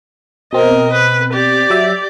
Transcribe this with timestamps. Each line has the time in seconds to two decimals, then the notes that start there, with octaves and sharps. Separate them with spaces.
0.53 B2 C4 A#4 D#5
0.93 B4
1.33 G4 D5
1.70 F#3 E5